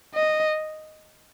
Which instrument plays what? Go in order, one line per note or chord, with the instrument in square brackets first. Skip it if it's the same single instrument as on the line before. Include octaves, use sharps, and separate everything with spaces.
[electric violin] D#5